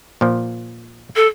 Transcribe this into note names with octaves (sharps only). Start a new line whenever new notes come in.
A#2 F3
A4